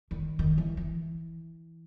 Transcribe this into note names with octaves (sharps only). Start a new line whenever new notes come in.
D#3
D#3
E3
E3